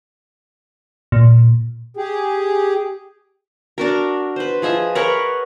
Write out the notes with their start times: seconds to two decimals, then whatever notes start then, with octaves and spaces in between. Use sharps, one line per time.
1.12 A#2
1.97 G4 G#4
3.78 D4 F#4 A#4
4.36 B4 C5
4.62 F3 G#4 D#5 E5
4.95 A#4 B4 C#5 F#5